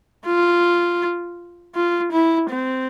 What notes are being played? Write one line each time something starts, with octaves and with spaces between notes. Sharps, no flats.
F4
F4
E4
C4